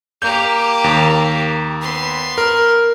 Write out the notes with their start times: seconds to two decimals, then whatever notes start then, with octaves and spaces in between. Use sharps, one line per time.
0.22 A#3 G4 G6
0.84 D#2
1.82 B3 C6
2.38 A#4